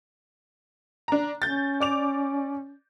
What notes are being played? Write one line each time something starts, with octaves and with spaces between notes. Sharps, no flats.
D4 A#5
C#4 G6 A6
D5 D6 F7